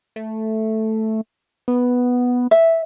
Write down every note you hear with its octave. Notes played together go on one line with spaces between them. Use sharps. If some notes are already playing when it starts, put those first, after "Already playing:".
A3
B3
E5